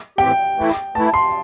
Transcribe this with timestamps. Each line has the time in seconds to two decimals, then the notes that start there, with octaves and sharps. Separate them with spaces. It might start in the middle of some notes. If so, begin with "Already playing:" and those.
0.18 A2 E3 C4 G4 G5
0.57 E3 A3 E4
0.95 E3 A3 E4 A5
1.14 C6